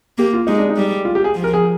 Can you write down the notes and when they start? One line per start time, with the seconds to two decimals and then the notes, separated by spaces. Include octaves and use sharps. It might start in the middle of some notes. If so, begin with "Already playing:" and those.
0.18 A#3 G4
0.34 F4
0.47 G#3 D#4
0.58 D4
0.69 D#4
0.77 G3
1.05 F4
1.15 G4
1.24 G#4
1.35 F3
1.44 A#4
1.54 G#4